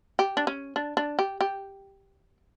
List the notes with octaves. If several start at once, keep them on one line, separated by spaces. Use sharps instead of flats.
G4
D4
C#4
D4
D4
G4
G4